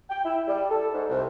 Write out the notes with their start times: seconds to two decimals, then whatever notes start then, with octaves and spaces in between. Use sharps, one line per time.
0.10 G5
0.25 E4
0.48 G3
0.70 A4
0.94 G#2
1.09 C2